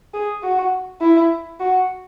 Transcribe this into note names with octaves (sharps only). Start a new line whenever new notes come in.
G#4
F#4
E4
F#4